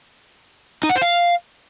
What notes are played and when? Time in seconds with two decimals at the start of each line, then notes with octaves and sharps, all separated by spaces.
0.83 D#4
0.89 F#5
0.96 C5
1.02 F5